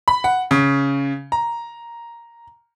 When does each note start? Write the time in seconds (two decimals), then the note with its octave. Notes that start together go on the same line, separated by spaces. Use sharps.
0.08 B5
0.24 F#5
0.51 C#3
1.32 A#5